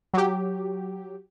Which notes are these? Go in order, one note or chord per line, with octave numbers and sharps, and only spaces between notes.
F#3 G4